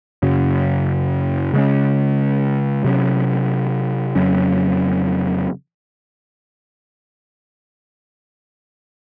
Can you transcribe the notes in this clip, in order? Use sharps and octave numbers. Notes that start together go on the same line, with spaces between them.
F#2 C#3 F#3
C#3 G#3 C#4
C3 F#3 C#4
F2 C#3 F#3 C#4